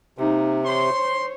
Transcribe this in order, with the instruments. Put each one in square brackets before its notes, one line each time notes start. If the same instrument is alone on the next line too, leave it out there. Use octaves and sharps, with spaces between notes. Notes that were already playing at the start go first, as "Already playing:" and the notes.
[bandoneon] C3 [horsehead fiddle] A#3 D#4
[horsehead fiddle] C5 C#5 [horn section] C6